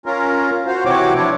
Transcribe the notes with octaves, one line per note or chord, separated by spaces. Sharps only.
C#4 F4 A#4
F4 F#4 C5 F5
C3 E3 C4 F#4 C#5 D6
F3 D4 E4 C#5